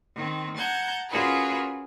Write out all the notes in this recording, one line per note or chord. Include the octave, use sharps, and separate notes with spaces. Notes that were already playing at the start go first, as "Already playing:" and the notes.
D#3 C4
F#5 A5 A#5 G6 G#6
C#4 F4 F#4 G#4 A#4 B4